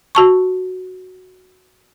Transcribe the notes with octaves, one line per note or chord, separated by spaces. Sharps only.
F#4 A5 C#6